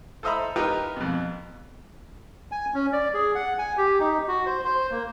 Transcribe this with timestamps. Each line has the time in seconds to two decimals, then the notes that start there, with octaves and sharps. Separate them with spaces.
0.23 A4 C5 D#5 E5 A#5 B5
0.56 D#4 F4 G4 A#4 B4
0.96 F2 B2
2.52 G#5
2.74 C#4
2.93 D5
3.14 G#4
3.35 F#5
3.59 G#5
3.77 G4
4.00 D#4
4.28 F#4
4.46 C5
4.65 C5
4.91 A#3